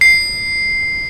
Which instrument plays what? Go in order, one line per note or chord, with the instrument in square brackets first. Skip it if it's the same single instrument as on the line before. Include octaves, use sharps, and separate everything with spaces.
[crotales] C7